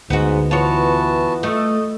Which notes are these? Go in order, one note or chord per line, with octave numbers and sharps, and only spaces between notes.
D2 G#2 B3 F#4
E3 B3 F4 F#4 C#5 A5
A3 D#5